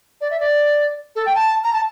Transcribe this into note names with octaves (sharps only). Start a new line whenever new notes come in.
D5
E5
D5
A4
G5
A5
A#5
A5